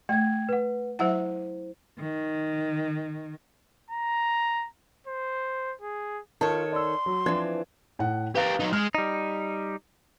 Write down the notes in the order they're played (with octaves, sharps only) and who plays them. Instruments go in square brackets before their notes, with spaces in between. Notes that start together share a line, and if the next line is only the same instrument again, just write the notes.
[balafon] A3 [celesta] G5 G#6
[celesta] B4 F#5
[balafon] F#3 E5 F#5 [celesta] E4 C5
[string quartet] D#3
[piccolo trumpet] A#5
C5
G#4
[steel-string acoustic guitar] D#3 A4 C#5 [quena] F4 [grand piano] A5
[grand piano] D5 E6 [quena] C6
[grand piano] F#3
[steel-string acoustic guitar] E3 C4 [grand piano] F3 D4 G#6
[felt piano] A2 F#5
[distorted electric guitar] G4 A#4 [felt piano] B4 F5 A6
[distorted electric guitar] F#3 D#4
[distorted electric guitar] G#3 [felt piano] F6
[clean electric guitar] G3 D#4